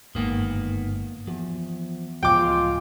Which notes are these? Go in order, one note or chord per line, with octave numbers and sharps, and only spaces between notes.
G1 G#2 D#3 A#3 B3
E2 F3
C#2 A2 F3 G#3 F4 G5 D6